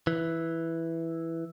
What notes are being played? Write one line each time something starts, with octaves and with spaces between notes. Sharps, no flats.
E3